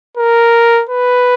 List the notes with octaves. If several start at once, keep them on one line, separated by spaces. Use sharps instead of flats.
A#4
B4